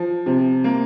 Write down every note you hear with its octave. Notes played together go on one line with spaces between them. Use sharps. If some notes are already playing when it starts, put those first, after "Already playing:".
Already playing: F3
C3
A#3